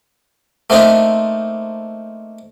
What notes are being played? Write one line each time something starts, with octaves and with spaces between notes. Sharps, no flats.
A3 A#3 C4 D4 D#4